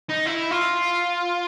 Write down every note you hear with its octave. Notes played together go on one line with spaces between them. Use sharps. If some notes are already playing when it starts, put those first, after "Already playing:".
D#4
E4
F4